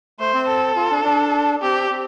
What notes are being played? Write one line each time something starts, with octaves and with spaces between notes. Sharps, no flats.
A3 C5
C4
A4
F4
D4
D4
C4 G4
C4